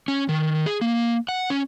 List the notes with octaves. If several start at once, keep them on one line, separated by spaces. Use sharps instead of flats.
C#4
D#3
G#4
A#3
F#5
C#4